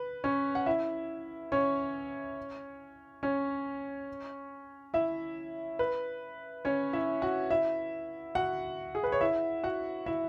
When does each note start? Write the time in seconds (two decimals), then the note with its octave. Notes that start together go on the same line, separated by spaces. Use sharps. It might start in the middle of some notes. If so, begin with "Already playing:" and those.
Already playing: B4
0.24 C#4 C#5
0.55 F#5
0.66 E4 E5
1.52 C#4 C#5
3.23 C#4 C#5
4.94 E4 E5
5.79 B4
6.65 C#4 C#5
6.93 E4 E5
7.22 F#4 F#5
7.50 E4 E5
8.35 F#4 F#5
8.95 G#4
9.03 B4
9.12 C#5
9.21 E4 E5
9.63 F#4 F#5
10.06 E4 E5